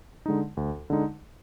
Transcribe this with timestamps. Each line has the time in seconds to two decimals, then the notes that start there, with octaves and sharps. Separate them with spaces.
0.26 D3 G#3 D#4
0.57 D2
0.90 D3 G#3 D#4